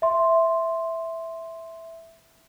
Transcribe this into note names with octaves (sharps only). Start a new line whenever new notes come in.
E5 C6